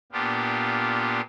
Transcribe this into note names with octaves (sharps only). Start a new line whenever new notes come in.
A#2 B3 D4 F4 G4